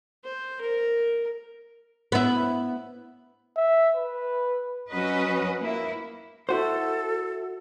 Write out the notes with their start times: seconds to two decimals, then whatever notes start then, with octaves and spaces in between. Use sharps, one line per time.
0.24 C5
0.61 A#4
2.12 B3 E4
3.57 E5
3.96 B4
4.89 F#3 C#4 F#4 B4 D#5
5.60 A#3 E4
6.49 E4 F#4 A4 C5